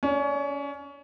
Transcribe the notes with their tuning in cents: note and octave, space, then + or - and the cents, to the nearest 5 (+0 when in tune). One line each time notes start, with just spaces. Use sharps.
C#4 +25 D5 +0